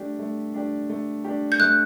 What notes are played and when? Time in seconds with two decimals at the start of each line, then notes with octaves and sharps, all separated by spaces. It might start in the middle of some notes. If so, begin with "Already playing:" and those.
Already playing: A3 D4 G4
0.19 A3
0.54 D4 G4
0.90 A3
1.24 D4 G4
1.52 G6
1.60 A3 F#6